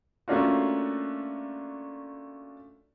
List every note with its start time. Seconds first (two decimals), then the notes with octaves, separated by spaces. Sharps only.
0.28 A3 A#3 C#4 D4 F4 F#4